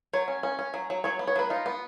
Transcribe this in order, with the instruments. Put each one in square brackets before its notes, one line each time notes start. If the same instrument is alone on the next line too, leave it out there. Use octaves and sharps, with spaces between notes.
[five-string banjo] F#3 C#5
C#4
C#4
C#4
F#3
F#3
F#3 C#5
B3
C#5
F#3 B4
D#4 F4
B3